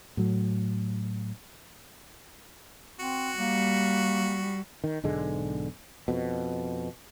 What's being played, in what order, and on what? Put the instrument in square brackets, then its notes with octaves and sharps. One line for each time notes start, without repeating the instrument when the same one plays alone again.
[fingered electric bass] A2 F#3
[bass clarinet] C4 [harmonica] F#4
[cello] G3 [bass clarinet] A#3
[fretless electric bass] D#3
B1 G#2 D3 G#3
F2 B2